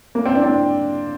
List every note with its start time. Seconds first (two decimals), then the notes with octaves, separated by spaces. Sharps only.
0.15 A#3
0.25 C4
0.35 D4
0.44 C4